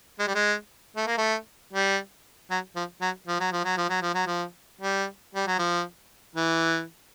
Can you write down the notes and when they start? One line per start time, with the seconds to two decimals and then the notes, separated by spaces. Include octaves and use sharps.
0.19 G#3
0.27 G3
0.35 G#3
0.96 A3
1.07 A#3
1.18 A3
1.73 G3
2.51 F#3
2.76 F3
3.01 F#3
3.28 F3
3.40 F#3
3.52 F3
3.65 F#3
3.77 F3
3.89 F#3
4.02 F3
4.15 F#3
4.27 F3
4.81 G3
5.35 G3
5.47 F#3
5.59 F3
6.35 E3